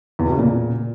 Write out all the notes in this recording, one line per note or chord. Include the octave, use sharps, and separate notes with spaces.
E2
B2
C#3
A#2